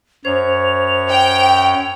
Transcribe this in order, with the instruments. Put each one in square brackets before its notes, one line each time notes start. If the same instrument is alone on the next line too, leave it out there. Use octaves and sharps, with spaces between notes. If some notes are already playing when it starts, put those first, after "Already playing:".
[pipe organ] F#2 C#5 [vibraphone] C5 [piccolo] F7
[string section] G5